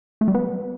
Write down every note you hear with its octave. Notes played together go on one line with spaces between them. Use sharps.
A3
G3
B3